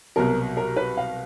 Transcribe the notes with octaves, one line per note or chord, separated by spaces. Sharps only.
C2 B2 F#3 A#4
A#4
B4
F5